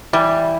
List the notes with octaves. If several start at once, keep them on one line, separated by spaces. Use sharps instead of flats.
E3 G3